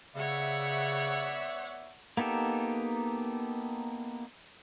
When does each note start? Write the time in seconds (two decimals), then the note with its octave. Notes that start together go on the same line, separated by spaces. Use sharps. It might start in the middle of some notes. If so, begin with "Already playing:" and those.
0.16 C#3 B3 C#5 D5 E5 F#5
2.17 A#3 B3 D#4 G4 A4